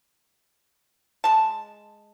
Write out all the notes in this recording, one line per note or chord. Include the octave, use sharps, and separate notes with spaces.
G#3 A5